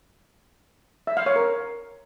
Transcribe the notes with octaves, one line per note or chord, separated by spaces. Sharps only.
E5
F5
C#5
A#4